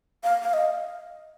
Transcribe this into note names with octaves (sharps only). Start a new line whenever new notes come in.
F5
F5
D#5